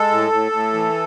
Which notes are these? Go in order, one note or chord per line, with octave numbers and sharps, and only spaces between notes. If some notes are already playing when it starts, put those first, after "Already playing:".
Already playing: G#3 A4
A2
A2
A2
E3